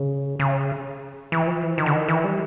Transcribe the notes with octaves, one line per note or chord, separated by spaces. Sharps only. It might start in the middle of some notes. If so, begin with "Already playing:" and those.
Already playing: C#3
C#3
E3
F3
E3
D#3
D3
D#3
E3
G3